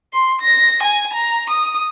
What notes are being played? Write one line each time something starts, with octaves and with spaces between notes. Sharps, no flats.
C6
A#6
G#5
A#5
D#6